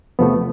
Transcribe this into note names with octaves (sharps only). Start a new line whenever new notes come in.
E2 C3 F3 A3 B3